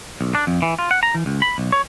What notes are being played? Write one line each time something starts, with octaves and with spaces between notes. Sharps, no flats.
B1
D4
F2
E3
F4
F#5
A#5
E3
C#2
B5
B1
C#5